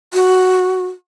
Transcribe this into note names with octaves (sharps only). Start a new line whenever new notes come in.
F#4